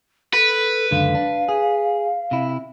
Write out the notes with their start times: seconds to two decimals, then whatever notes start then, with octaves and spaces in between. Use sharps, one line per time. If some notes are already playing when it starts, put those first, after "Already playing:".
0.33 A4 B4
0.91 C#2 F#2 D3 F5
1.15 D4
1.49 G#4
2.31 C3 E4